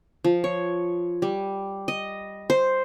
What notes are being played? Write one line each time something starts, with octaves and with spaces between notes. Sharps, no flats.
F3
C#5
G3
D#5
C5